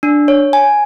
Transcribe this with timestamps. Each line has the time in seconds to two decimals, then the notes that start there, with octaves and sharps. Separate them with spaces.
0.03 D4
0.28 C#5
0.53 G#5